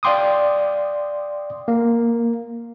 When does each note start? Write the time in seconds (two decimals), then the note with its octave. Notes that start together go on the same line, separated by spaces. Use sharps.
0.03 D5 F5 G5 C6 D6 D#6
1.68 A#3